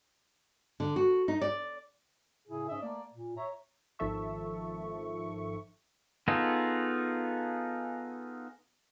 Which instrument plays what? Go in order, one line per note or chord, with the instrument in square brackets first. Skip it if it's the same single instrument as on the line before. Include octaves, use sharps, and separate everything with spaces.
[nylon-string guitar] D3
F#4
D#4
D5
[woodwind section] A2 C#3 E4 G#4
G#2 C#4 D#5 E5
A3 A#3 D5
A#2
C#5 E5 A#5
[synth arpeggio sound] G#1 D#3 F3 A4 E5 C#6
[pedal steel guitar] B3 D#4 F4 G#4 A4